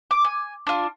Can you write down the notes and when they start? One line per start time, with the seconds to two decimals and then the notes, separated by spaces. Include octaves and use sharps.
0.11 D6
0.24 G#5
0.67 D4 F4